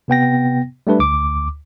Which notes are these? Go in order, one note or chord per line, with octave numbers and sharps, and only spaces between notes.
C3 B3 G5 A#6
G3 A3 D4 B4
D2 D6